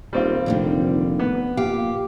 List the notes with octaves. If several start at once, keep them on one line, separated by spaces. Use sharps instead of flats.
D#1 G3 C4 F4
F1 A#2 D3 D#3
B3
A#2 G4 F5